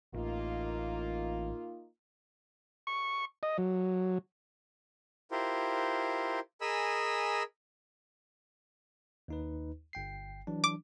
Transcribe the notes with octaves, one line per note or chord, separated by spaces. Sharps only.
A1 A#3 D#4 F4
C#6
D#5
F#3
E4 F4 G4 A#4 C5
G#4 A#4 D#5 G#5 B5 E6
D#2 D#4 B4
G1 G5 C7
E3 F#3 D4
D6